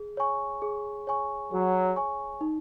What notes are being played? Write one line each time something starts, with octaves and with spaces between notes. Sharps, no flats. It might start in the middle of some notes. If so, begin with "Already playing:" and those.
Already playing: G#4
C#5 G#5 C#6
G#4
C#5 G#5 C#6
F#3 G#4
C#5 G#5 C#6
D#4